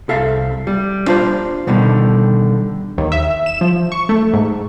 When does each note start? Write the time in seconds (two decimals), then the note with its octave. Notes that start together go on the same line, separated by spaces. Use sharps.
0.09 C2 A4 E5 F5
0.67 G3
1.07 D4 F4 C5
1.67 B2 D3 D#3 G3
2.98 D#2
3.12 E5
3.46 E7
3.61 F3
3.92 C#6
4.09 A3
4.33 G#2